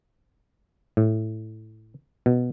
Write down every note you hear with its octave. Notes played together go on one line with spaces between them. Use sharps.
A2
B2